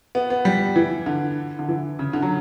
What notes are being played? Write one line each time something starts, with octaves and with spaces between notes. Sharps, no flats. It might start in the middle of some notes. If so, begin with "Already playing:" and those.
B3
B3
G3
E3
D3
D3
E3
C#3
D3
F#3